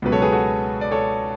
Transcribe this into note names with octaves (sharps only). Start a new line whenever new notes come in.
C#2 B2 F#3 B4
A4 C#5
G#4 B4
F#4 A4
D5
A4 C#5